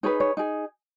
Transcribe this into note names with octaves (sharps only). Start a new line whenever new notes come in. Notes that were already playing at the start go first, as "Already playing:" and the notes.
D#4 G#4 B4 C#5
C#5
D#4 G#4